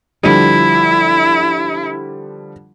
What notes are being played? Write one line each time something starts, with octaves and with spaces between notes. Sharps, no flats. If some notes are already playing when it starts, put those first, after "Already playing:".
D3 F3 G3 E4